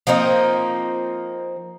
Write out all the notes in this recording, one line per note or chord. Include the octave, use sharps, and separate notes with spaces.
F3 A#3 C4 D#4